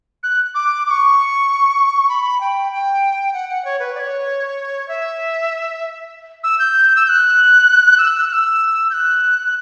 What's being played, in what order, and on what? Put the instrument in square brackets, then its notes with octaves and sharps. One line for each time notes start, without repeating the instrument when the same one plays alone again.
[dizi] F#6
D6
D6
C#6
B5
G5
G5
F#5
F#5
C#5
B4
D5
C#5
E5
E6
G6
E6
G6
F#6
E6
F#6
E6
G6
F#6